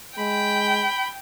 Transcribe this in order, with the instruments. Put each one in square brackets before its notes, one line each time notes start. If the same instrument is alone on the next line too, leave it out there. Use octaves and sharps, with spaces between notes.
[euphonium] G#3 [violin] G5 [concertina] B5